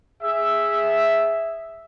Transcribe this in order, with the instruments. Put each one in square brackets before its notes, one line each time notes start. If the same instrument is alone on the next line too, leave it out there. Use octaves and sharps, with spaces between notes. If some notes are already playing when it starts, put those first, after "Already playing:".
[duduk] G#4 [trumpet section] E5